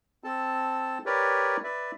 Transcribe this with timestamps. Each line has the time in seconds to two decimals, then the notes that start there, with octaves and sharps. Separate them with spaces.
0.24 C4 A4 A5
1.06 G4 A#4 B4 C#5 D5
1.64 B4 D5 E5